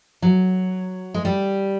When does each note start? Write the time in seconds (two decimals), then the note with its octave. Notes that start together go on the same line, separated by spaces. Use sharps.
0.22 F#3
1.14 G#3
1.25 G3